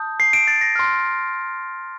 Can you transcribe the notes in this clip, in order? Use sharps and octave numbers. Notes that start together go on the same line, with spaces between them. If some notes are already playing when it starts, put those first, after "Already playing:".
Already playing: A5 D#6 G6
C7
D7
A6
A#6
C6 F6